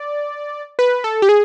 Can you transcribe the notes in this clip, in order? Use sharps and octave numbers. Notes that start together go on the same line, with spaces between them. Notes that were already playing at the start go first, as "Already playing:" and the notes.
Already playing: D5
B4
A4
G4
G#4